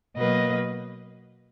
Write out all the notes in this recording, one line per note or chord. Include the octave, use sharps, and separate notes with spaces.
B2 F#3 A#3 B4 D#5